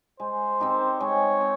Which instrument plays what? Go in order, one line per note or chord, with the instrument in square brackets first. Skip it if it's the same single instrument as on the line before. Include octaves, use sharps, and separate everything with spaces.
[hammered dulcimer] G#3 [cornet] C5
[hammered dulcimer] C4 D#4 G4
[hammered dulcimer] G#3 [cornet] C#5
[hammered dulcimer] C4